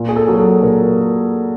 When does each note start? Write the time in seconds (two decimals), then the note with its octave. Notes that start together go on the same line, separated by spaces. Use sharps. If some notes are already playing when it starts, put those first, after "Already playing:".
Already playing: A#2
0.09 G#4
0.16 A4
0.28 F#3 A#4
0.39 A4
0.63 A#2 A#4